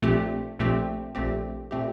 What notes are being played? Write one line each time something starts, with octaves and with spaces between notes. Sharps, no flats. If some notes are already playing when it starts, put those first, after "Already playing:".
A#1 A#2 A3 C4 G4
A#1 A#2 A3 C4 G4
A#1 A#2 A3 C4 G4
A#2 A3 C4 G4